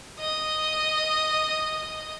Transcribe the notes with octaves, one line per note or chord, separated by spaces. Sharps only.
D#5 D#6